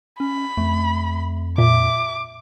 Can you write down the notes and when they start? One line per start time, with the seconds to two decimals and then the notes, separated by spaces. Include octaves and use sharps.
0.20 C#4 B5
0.57 F2 A3
1.58 A#2 E5 D6